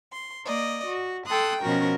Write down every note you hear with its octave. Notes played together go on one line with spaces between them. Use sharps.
C6
A#3 D5 D#5
F#4
A4 G5 C6 D#6 F#6
B2 F3 C#4 F#4 A#4